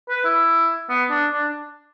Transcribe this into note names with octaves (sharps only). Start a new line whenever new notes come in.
B4
E4
B3
D4
D4